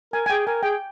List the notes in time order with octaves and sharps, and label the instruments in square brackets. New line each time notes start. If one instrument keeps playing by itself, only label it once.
[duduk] A#4 [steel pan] G#5
[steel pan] G#5
[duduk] G#4 [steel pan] G5
[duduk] A#4 [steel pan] G#5
[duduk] G#4 [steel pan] G5